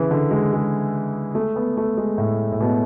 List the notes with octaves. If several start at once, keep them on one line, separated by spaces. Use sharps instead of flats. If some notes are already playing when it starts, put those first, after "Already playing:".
Already playing: C#3 E3
D3
G#3
G#3
A3
B3
A3
G#3
A2
A2
B2